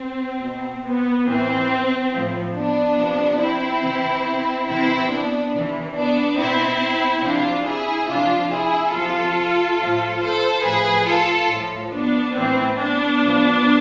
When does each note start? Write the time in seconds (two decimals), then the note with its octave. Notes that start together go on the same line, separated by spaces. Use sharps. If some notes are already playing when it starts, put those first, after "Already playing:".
Already playing: C4
0.42 B2
0.85 B3
1.27 A2 E3 C4
2.13 A2 F3
2.55 B3 D4
2.98 C3 F3
3.40 C4 E4
3.82 C3 E3
4.68 C3 E3 C4 E4
5.10 B3 D4
5.53 C3 E3
5.95 B3 D4
6.39 B2 C4 E4
7.23 C3 F3 D4 F4
7.65 E4 G#4
8.08 C3 F3 D4 F4
8.51 E4 G#4
8.93 C3 F3 F4 A4
9.78 A2 F3
10.21 A4 C5
10.63 A2 F3 G#4 B4
11.06 F4 A4
11.48 A2 F3
11.91 B3 D4
12.33 A2 E3 C4
12.76 B3 D4
13.19 A2 F3